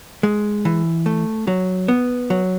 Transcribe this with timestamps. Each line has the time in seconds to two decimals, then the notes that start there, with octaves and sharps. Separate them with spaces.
0.23 G#3
0.65 E3
1.06 A3
1.47 F#3
1.88 B3
2.30 F#3